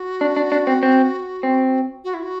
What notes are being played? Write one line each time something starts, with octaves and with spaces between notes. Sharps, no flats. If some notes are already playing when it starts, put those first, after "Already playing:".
Already playing: F#4
D4
D4
D4
C4
C4
C4
F#4
E4
F#4